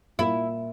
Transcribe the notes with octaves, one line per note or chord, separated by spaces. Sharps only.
A#2 E4